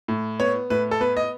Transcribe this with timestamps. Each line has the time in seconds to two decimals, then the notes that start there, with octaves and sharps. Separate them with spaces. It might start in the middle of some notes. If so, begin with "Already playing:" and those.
0.08 A2
0.40 B3 C#5
0.70 A2 B4
0.91 A4
1.00 B3 B4
1.17 D#5